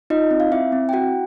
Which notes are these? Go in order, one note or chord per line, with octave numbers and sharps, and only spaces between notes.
D#4 F4 D#5
C4
F5
C4 E4 E5
C4
G5
E4 F#4 F#5